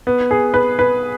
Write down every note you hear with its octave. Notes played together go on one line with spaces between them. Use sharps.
B3
G#4
B4
B4